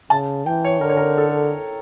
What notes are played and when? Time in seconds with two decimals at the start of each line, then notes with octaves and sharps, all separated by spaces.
0.10 C#3 A5
0.46 E3 G5
0.65 C#5
0.81 D3 A#4
0.89 C#5
0.97 A#4
1.18 A4